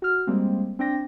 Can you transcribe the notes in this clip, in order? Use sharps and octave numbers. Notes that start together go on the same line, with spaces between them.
F#4 F6
G3 G#3 A#3 C4
C4 D4 G5 A#6